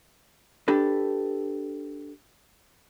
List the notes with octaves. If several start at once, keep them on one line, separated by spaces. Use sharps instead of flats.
D4 G4 A4 B4